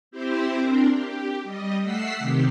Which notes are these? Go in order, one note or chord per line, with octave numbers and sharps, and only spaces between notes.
C4 E4 G4 C5
C4 D4 A#4
G4
G3 D#5
A3 F#5 E6 B6 C7
C3 D#3 G4